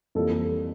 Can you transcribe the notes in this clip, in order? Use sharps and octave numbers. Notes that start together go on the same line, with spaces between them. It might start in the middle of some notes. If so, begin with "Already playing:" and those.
F2 E3 G3 A#3 A4